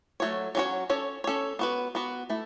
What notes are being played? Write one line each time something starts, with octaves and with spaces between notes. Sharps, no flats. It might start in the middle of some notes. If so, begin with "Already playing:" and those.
F#3 A3 C#5
F#3 A3 C#4 F#4 C#5
C#4 A4 C#5
C#4 A4 C#5
B3 F#4 B4
B3 F#4 B4
A3 E4